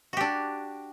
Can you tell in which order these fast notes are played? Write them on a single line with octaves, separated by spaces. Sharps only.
F#4 G4 D4